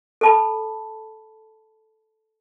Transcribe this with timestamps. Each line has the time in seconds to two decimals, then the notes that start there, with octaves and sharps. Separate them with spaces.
0.21 A4 A5 B5